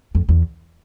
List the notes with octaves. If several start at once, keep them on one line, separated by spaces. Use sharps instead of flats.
F2
E2